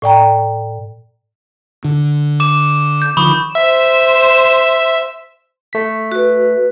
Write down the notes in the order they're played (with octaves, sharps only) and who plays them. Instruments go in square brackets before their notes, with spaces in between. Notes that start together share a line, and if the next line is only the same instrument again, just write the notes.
[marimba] A2 D5 G5 A#5
[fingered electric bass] D3
[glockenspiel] D6 E7
G6
[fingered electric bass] D3 D#3 F3 [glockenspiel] B5 C#6 D#6
[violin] C5 E7 [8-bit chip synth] E5
[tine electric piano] A3 B6
[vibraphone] F#4 B4